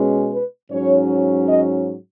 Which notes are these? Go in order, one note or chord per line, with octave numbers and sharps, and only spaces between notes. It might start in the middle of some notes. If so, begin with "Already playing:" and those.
Already playing: B2 G#3 C#4
B4
G#2 F#3 C#4 C#5
D#5